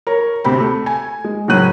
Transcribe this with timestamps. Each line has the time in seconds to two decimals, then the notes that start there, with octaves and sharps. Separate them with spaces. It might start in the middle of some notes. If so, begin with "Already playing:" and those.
0.07 A#4 C#5
0.44 D2 C3 C4 B5
0.60 A3
0.86 G#5
1.24 G#3
1.48 F#1 A2 F#3 C#4 F#6 D#7